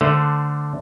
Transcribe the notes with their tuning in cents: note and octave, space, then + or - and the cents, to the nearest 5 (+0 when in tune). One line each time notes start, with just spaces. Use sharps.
D3 +0 A3 +0 C5 +0